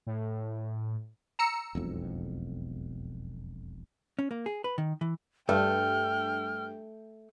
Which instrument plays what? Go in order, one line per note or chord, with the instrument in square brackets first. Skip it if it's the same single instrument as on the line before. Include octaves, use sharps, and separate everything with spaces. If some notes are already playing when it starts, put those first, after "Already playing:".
[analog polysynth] A2
[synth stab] A#5 E6 C#7
[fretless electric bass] E1 B1 F2
[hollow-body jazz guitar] C#4
A#3
G#4
B4
D#3
E3
[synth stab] G2 [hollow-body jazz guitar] A3 [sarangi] G5 [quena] F6